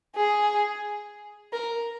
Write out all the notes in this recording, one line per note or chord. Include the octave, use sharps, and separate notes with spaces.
G#4
A#4